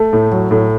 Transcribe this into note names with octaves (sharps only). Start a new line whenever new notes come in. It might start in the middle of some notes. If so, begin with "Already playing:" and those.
Already playing: A3
A2
F#3
A2